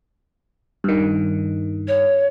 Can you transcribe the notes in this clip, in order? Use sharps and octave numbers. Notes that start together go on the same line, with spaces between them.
G2 D#3
C#5